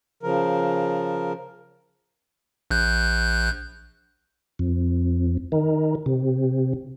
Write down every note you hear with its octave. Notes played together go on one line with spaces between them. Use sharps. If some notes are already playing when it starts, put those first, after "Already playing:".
C#3 F3 A#4
A#1 F#6 G6
F2
D#3
C3